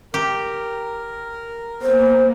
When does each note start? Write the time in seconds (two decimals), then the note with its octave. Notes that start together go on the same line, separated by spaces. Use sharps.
0.14 G4 A#4
1.82 A#3 B3 C5